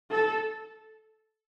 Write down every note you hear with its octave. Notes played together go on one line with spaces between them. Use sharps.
A4